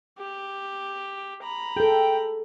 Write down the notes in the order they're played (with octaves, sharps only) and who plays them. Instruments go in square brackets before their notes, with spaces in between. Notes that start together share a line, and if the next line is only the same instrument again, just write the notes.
[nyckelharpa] G4
A#5 B5
[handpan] G#4 A4 [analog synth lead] G5